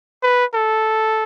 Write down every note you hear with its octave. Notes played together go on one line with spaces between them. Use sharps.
B4
A4